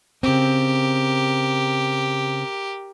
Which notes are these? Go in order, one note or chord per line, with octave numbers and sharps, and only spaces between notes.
C#3 C4 G4 A#4